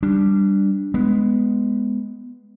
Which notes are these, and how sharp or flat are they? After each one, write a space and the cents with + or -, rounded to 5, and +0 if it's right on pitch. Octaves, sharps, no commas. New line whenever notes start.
G3 +0 D4 +0
G#3 +0 B3 +0